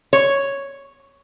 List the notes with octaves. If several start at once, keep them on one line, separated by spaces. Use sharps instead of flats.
C#5